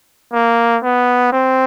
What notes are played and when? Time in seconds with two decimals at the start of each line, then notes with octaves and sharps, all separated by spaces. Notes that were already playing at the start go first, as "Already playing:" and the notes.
0.34 A#3
0.83 B3
1.33 C4